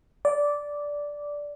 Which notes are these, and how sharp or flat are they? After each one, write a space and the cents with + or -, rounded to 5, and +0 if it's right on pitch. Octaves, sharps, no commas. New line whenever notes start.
D5 -10